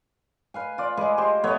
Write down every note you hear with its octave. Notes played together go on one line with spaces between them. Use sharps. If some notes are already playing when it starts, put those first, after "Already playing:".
B4 F5 G#5
F4 D5
G#3 G#4 B4 D#5
G4 C5
A3 B3 B4 C#5